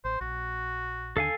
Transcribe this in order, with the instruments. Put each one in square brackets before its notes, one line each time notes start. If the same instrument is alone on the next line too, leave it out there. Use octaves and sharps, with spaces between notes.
[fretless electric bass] A1 [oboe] C5
[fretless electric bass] A#1 [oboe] F#4
[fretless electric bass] D#2 D3 [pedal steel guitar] A4 F5 G#5